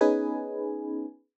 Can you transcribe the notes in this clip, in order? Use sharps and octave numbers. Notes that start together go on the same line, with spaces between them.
B3 C#4 D#4 G#4 B4 G#5